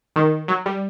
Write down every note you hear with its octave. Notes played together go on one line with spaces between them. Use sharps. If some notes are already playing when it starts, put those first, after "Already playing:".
D#3
F#3
G3